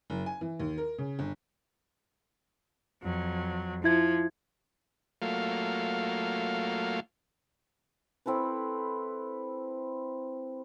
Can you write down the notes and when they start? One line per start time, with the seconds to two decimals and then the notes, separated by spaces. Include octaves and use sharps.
0.10 F#1
0.26 G#5
0.41 E3
0.60 D#2
0.78 A#4
0.98 C#3
1.19 G1
3.01 F2 F#3
3.84 F3 E4 E5 G#6
5.22 F#3 A3 A#3 F4 F5
8.26 C4 E4 A4 B4